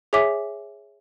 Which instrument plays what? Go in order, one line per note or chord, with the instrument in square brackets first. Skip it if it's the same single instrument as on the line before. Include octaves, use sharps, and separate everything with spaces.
[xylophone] G#4 C#5 E5 G#5 D6 B6